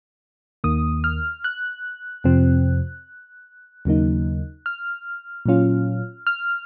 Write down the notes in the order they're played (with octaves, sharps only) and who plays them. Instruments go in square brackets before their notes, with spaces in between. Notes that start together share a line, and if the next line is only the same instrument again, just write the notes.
[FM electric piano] D#2 D#3 A#3 D#6
F6
F#6
F2 C3 F3 C4
D#2 C#3 F#3 A#3 D#4
F6
A#2 F#3 C#4 F4
F6